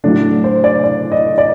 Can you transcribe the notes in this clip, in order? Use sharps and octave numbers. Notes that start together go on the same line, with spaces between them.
A2 F#3 A3 D4
C5
D5
D5
D#5
D5